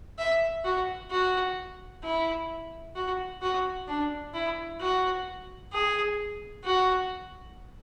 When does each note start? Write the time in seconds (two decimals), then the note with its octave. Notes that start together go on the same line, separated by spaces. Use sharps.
0.18 E5
0.65 F#4
1.11 F#4
2.03 E4
2.96 F#4
3.42 F#4
3.88 D4
4.34 E4
4.80 F#4
5.72 G#4
6.64 F#4